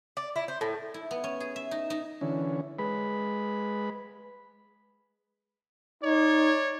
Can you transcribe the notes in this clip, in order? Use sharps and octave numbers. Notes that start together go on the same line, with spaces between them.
D5
E4
C5
A2
E4
B3
C#4
G#4
E5
D#4
D#4
D3 E3 C#4
G#3 B4 B5
D#4 C#5 D5